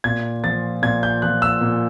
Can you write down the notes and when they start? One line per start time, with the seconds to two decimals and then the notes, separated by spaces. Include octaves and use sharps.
0.04 A#2 G#6
0.44 F3 A6
0.82 A#2 G#6
1.03 G6
1.22 F3 F#6
1.42 E6
1.61 A#2